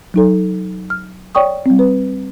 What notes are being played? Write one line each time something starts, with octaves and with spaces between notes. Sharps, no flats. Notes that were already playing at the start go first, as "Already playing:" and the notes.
F#3 D#4 A4
F6
C#5 D5 G5 C#6 D#6
G3 C4
B4